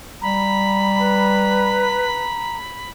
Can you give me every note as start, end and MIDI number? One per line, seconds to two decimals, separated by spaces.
0.22 2.09 55
0.22 2.57 82
0.22 2.90 83
0.99 2.29 71